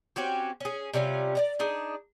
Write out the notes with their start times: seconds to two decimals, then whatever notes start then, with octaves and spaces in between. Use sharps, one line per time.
0.16 C4 C#4 F#4 G4
0.60 C#4 G#4
0.94 C3 G3 C#4 F4
1.35 D5 D#5 A#5
1.59 D4 D#4 G#4